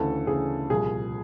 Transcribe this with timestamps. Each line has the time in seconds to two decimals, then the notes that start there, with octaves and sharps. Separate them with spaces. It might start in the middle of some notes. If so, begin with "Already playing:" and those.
Already playing: D2 C#3 E3 A4
0.27 D2 C#3 E3 G#4
0.70 C2 A#2 F3 G#4